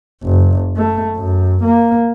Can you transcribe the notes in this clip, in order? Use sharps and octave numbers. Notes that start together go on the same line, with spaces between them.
F#1
A3
F#2
A#3